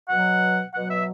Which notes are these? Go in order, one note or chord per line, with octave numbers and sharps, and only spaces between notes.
B2 F#3 F#5
B2 F#3 F#5
E5